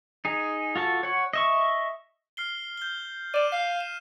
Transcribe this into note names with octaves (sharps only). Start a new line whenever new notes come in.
D#4 G#4
F4 F#4 A4 A5
C#5 F#5
D#5 E5 C#6
F6 C7 G7
G6 G7
D5 D#7 E7
F5 F6 C7
E7